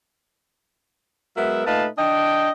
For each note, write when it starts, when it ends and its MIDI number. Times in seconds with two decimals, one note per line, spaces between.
1.37 1.62 54
1.37 1.62 56
1.37 1.62 59
1.37 1.62 70
1.37 1.62 76
1.66 1.86 46
1.66 1.86 57
1.66 1.86 63
1.66 1.86 71
1.66 1.86 77
1.66 1.86 81
1.98 2.49 62
1.98 2.49 75
1.98 2.49 79